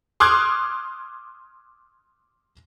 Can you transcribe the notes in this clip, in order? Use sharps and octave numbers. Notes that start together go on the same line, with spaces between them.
C6 D6 D#6 F6 F#6 G#6